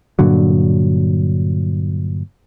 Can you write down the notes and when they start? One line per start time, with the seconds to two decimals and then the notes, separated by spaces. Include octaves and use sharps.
0.19 G2 A#2 D3 F#3